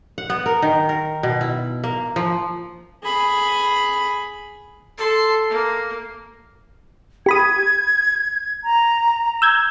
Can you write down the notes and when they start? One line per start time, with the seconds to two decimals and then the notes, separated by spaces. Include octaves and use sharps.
0.18 F#5
0.30 B3
0.46 A#4
0.62 D#3
0.89 A#4
1.23 B2
1.41 E4
1.84 A#3
2.16 F3
3.03 G#4 B5
4.98 A4 C6
5.50 A#3
7.26 G4 B5 D#6 G#6
8.64 A#5
9.42 E6 G6 G#6